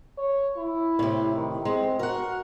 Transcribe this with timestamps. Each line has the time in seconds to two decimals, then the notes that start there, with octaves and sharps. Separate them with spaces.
0.18 C#5
0.57 E4
0.99 A2 C3
1.34 D#3
1.65 G#3 C4
1.99 F#4 A#4 F#5